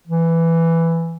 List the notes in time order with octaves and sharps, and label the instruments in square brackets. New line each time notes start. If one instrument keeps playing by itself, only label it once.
[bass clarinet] E3